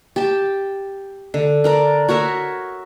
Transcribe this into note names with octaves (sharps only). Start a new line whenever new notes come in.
G4 A5
D3
D4 A#4 D5
F#4 A#4 C#5 E5